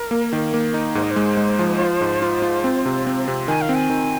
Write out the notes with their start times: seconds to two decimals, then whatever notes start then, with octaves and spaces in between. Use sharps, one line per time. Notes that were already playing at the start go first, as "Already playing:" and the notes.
Already playing: A#4
0.11 A#3
0.33 D#3
0.54 A#3
0.74 D#4
0.95 G#2 C5
1.03 D#5
1.11 C5
1.16 G#3
1.37 G#3
1.59 F3
1.80 F4
2.01 G#2
2.22 F4
2.42 F4
2.64 C4
2.86 C3
3.07 C4
3.28 C3
3.48 D#3 G#5
3.61 F5
3.69 C4
3.76 G#5
3.90 D#3